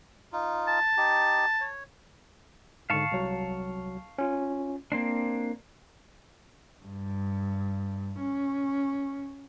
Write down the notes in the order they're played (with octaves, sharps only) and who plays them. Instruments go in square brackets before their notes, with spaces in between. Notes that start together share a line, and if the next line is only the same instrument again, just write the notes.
[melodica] D#4 F4
[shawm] A5
[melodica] D#4 G4
C#5
[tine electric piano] G#2 D3 [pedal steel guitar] F5 A5 C#6
[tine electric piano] C2 F#3
C#4 F4
[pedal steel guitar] A#3 C4 D4 [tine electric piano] C7
[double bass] G2
C#4